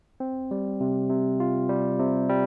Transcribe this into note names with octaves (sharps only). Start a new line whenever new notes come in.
C4
G3
C3
C3
F4
G3
C3
G3